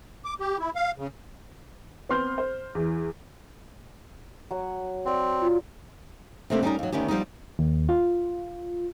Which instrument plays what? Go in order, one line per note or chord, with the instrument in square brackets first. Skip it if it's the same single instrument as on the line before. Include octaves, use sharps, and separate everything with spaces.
[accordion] D6
G4
E4
F5
C#3
[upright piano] B3 C4 C6 F6 G6
C5
E2 E3
[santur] F#3 F#5
[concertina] C4 [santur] F#4 D5
[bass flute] F4
[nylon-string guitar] C3 A3 A#3 C4 D4 G4
G3 C#4 D#4 A#4
D#2 F#3
D2 D#3 B3 C#4 G4
F3 G3 B3 D#4
[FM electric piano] D#2
F4